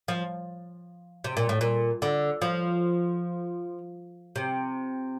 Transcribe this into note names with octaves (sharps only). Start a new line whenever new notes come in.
F3
C3
A#2
A2
A#2
D3
F3
C3